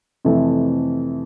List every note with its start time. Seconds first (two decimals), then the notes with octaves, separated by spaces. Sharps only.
0.25 F2 C3 E3 A3